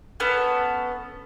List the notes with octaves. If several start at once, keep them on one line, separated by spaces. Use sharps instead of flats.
B3 C#4 A4